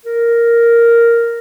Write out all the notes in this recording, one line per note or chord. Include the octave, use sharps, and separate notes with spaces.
A#4